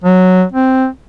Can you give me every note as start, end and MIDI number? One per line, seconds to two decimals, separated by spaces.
0.04 0.45 54
0.52 0.87 60